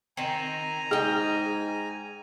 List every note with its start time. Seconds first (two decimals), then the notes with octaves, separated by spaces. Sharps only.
0.17 D#3 C4 G#5 A#5
0.91 G#2 G#4 D#5 G5